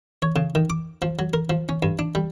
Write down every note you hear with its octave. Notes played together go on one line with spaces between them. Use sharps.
C#5
C#3
D#3
D6
F3
F#3
A#4
F3
C#4
G2
D4
G3